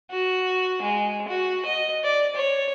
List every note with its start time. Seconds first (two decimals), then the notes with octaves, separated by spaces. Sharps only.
0.11 F#4
0.82 G#3
1.28 F#4
1.66 D#5
2.04 D5
2.36 C#5